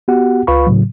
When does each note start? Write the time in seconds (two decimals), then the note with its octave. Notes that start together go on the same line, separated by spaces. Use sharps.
0.08 B3 F#4 G4 F#5
0.47 C#2 F4 B4 F5 B5 C#6
0.67 A2 C#3 F#3